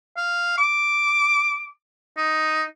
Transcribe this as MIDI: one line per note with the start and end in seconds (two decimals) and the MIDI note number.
0.17 0.57 77
0.58 1.69 86
2.17 2.63 63